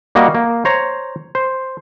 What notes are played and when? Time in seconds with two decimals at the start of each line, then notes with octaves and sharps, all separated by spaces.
0.15 G3 A#3 F#4 D#5 F#5
0.35 A#3
0.65 C5 C#5 A#5
1.35 C5